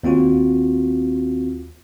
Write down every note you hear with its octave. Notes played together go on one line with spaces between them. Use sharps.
D#2 C4 F4 F#4